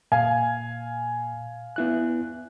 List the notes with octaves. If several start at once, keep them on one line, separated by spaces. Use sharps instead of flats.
A#2 F5 G#5
B3 E4 F#6